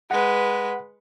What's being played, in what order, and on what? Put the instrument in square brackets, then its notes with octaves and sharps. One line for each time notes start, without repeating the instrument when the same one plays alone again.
[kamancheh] G#3 B4 [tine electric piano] F#5